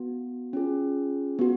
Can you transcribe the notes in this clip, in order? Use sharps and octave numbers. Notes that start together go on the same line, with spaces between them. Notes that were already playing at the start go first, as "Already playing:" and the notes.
Already playing: B3 F#4
C#4 F4 G#4
B3 F#4